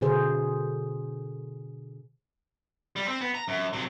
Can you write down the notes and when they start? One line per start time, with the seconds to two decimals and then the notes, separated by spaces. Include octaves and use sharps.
0.01 B2 D3 G#4 C5
2.96 G3
3.08 C4
3.21 B3
3.35 A#5
3.48 F#2
3.73 C3 F#3